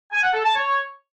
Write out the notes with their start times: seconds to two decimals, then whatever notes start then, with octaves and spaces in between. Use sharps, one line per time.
0.12 G#5
0.23 F#5
0.34 A4
0.45 A5
0.56 C#5